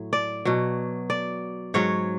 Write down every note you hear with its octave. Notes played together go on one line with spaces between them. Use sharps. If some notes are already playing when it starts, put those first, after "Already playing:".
Already playing: A2 F#3
D5
B2 F#3
D5
G#2 F#3 C#5